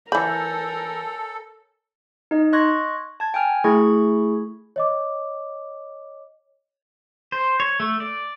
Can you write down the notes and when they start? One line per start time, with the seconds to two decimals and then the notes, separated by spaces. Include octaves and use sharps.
0.12 E3 A4 A#4 C#5 G#5 B5 G6
2.31 D#4 D#5
2.53 D#5 C6 C#6 F#6 G#6 A#6
3.20 A5 G#6
3.34 G5 G#5 F6
3.64 A3 E4 G#4 B5 C#6 G#6
4.76 C#5 D#5 D6
7.32 C5
7.60 C#5
7.80 A3
8.00 D5